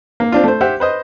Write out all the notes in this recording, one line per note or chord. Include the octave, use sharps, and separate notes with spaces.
A#3
C4 D4 F4
A3 C5
G4 C5 E5 F#5
B4 C5 D#5